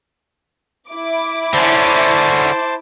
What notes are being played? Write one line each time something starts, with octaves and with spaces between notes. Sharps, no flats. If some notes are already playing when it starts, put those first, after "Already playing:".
E4 D6
D3 C#4 C5 A5